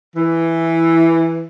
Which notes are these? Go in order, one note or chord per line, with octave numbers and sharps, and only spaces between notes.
E3